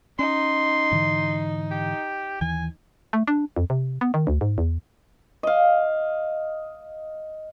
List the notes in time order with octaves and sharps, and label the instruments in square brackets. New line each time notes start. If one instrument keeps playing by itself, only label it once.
[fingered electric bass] C#4 [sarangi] D#4 [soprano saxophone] C6
[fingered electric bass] G#2 D3 E3
[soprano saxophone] G4
[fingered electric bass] D#2 E3 [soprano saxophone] G#5
[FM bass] A3
D4
F2
C3
B3
D#3
D2
G#2
E2
[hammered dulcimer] D#5 F5